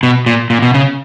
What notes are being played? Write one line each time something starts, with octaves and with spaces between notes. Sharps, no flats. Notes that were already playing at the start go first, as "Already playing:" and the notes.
B2
A#2
A#2
B2
C#3